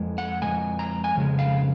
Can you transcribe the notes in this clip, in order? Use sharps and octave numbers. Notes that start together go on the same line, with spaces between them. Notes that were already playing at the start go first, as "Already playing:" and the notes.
Already playing: F2 G#3
F#5
F2 C#3 G#3 G#5
A#5
G#5
F2 C#3 G#3
F5